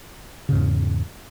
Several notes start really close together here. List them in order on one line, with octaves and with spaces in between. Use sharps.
C#3 G#2 E2